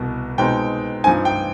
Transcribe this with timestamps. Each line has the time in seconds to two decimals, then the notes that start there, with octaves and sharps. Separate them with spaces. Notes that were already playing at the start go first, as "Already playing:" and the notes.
Already playing: C2 B2 B3
0.38 B2 G#3 C4 D#4 G5
1.04 G2 F3 C4 D#4 G#5
1.25 G5